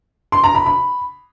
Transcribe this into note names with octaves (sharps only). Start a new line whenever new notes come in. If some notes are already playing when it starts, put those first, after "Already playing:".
C6
A#5
B5
B5